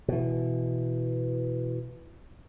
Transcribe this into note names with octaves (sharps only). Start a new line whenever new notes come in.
B2 E3